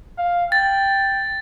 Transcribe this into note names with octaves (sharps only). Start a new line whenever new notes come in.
F5
G5 A6